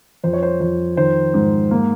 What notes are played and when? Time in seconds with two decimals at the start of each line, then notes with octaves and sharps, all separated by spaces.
0.24 F2 C5
0.33 C#5
0.43 C5
0.60 F2 C5
0.97 D#3 C5
1.34 G#2
1.71 A#3